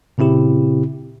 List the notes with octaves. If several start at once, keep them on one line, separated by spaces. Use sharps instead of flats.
A#2 C#3 C4 E4 G4